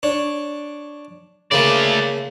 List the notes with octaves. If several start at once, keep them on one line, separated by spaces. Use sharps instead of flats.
D4 C#5
C#3 A3 A#3 D5